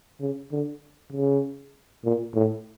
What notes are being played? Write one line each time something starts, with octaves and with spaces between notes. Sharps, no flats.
C#3
D3
C#3
A#2
A2